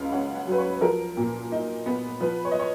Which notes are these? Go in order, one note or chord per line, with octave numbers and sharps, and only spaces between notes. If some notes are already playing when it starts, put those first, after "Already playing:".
Already playing: C#2 C#3 D#5 F5
C#4 F#5
F#5
F#3 B4
C#5
F3 A#4
A#2
D#4
B3
F3 B4
C#5
D#5
C#5